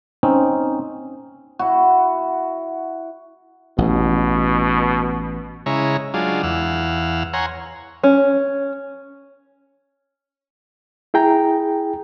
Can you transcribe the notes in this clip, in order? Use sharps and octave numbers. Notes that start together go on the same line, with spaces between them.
C4 C#4 D#4
E4 F#4
A1 B2
C#3 G#3 E4 C#5 A#5
F#3 G#3 D4 F4
E2 F5 F#5 E6
C#5 F#5 G#5 A#5 C6
C#4
E4 G#4 G5 A#5